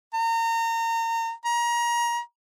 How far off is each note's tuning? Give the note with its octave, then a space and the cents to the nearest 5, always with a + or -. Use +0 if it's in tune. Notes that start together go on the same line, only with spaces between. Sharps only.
A#5 -30
A#5 +30